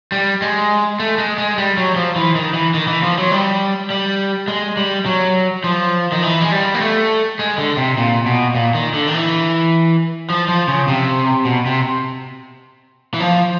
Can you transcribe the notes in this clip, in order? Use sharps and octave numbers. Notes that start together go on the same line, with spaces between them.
G3
G#3
A3
G#3
G#3
G3
F#3
F3
E3
D#3
E3
D#3
E3
F3
F#3
G3
G3
G#3
G3
F#3
F3
D#3
E3
G#3
G3
A#3
A3
G#3
D3
C3
A#2
B2
A#2
D#3
D3
D#3
E3
F3
F3
C#3
C3
B2
C3
E3
F3